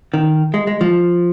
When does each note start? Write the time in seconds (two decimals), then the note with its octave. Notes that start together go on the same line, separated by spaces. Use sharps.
0.14 D#3
0.54 G#3
0.67 G#3
0.81 F3